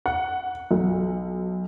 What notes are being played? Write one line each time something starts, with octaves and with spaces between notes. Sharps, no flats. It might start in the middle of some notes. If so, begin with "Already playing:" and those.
F#5
B1